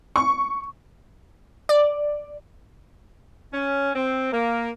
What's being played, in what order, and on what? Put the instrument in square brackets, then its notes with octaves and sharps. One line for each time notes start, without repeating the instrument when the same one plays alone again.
[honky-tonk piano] C#6
[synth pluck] D5
[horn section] C#4
C4
A#3